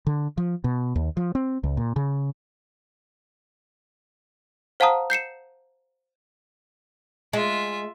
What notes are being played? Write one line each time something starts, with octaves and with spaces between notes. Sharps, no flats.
D3
F3
B2
D#2
F3
C4
C#2
A#2
C#3
C5 F5 F#5 A5 A#5 D#6
G6 C7 C#7 E7
G#3 F4 E5